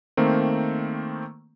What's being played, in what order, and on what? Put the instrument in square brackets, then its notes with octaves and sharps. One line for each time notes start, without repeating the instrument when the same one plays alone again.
[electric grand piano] D#3 A3 A#3 C4